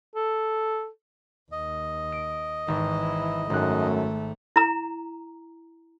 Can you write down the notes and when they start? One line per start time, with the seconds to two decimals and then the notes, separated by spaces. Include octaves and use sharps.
0.15 A4
1.52 D#2 D#5
2.12 D7
2.68 G#1 E3 E4
3.50 G#1 F#2 A3 F#6
4.56 E4 A#5